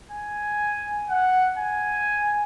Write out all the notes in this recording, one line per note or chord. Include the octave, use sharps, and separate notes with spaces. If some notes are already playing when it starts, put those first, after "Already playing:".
G#5
F#5
G#5